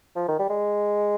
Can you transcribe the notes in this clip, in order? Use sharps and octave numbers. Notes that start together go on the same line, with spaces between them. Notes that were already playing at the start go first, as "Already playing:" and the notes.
F3
D#3
G3
G#3